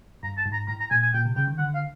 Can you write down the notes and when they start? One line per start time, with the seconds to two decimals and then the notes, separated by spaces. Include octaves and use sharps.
0.23 G2 A#5
0.38 A5
0.46 G#2
0.53 A#5
0.68 A2 A#5
0.80 A#5
0.91 A#2 G#5
1.02 G#5
1.13 A#2 G5
1.25 C3
1.36 C#3 G5
1.48 D#3
1.58 D3 F#5
1.74 F5